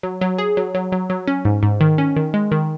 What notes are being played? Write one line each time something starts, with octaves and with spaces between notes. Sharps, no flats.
F#3
F#3
G#4
F#3
F#3
F#3
F#3
C#4
G#2
G#2
D#3
C#4
D#3
G#3
D#3